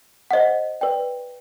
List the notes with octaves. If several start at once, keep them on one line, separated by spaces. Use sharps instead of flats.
C5 D#5 F#5
B4 D5 G5